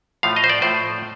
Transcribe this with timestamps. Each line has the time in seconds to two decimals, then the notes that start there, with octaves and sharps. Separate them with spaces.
0.23 A2 F3 A3 F5
0.36 D#5
0.44 C5
0.50 D5
0.62 A2 F3 A3 C5